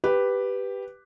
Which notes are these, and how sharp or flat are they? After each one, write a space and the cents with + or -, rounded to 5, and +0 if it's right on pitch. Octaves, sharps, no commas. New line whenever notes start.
G4 +0 B4 +0